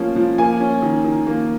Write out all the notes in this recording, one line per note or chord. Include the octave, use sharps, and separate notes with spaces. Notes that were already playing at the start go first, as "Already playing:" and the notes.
Already playing: F3 A#3 C#4
F3
A#3 G#5
C#4
D#3
D#3
A#3